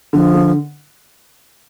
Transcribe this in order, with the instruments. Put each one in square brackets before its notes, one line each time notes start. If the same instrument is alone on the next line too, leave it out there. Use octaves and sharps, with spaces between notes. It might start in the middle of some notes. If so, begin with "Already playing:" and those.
[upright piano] D3 [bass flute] F3
[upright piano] D3